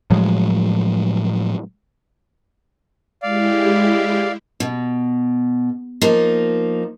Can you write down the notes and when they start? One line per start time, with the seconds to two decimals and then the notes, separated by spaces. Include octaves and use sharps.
0.10 A2 F3 F#3 G#3
3.23 G#3 E4 G4 D5 F5
4.60 B2
6.02 F3 A#3 D#4